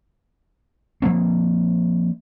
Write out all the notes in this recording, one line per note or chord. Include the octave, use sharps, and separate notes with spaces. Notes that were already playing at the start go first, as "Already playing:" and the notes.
F3 F#3 A#3 C4